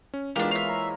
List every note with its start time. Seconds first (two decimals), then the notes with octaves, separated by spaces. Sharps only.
0.14 C#4
0.36 E3 G#3 A#3 B3 D4 F4 G4
0.51 E4 C5 C#5 E5 F5
0.68 A#5